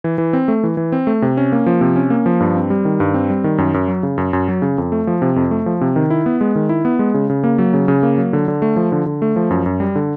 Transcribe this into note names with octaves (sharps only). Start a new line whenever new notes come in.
E3
E3
C4
A3
E3
E3
C4
A3
C3
C#4
A#3
F3
C3
C#4
A#3
F3
G2
C4
G3
D#3
G2
C4
G3
D#3
F#2
F#2
F#3
C#3
F#2
F#2
F#3
C#3
F2
A3
F3
C3
F2
A3
F3
C3
D#3
E4
B3
G#3
D#3
E4
B3
G#3
C#3
C#3
A#3
F#3
C#3
C#3
A#3
F#3
D3
D3
A3
F3
D3
D3
A3
F3
F#2
F#2
G3
D3